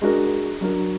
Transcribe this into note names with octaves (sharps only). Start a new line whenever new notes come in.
G#3 D4 F#4 A#4
F#3 D4 F#4 A#4